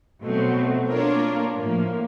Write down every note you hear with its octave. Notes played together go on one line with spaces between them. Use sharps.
B2 F#3 A3 C4
A#3 D4 F4 A#4 C#5
A2 F3 A#3